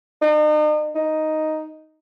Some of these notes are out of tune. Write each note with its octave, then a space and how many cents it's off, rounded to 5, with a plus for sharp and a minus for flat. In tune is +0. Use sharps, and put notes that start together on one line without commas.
D#4 -40
D#4 +0